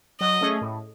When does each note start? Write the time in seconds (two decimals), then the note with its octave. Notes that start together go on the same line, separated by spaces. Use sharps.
0.20 F#3 D#5
0.41 A3 C#4 G#4
0.62 A2